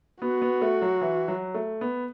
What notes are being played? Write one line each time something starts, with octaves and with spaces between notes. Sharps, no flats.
B3 F#4
B3
A3
F#3
E3
F#3
A3
B3